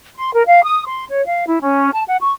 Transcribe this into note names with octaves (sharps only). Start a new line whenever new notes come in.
C6
A#4
F5
D#6
C6
C#5
F5
E4
C#4
A5
F#5
C#6